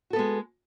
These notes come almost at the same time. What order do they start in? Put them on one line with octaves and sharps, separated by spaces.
F#4 A4 B3 G#3